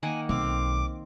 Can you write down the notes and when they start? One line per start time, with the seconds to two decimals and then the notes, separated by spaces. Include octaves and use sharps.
0.03 D#3 A#3 F#5 G#5
0.29 B1 C4 F5 D6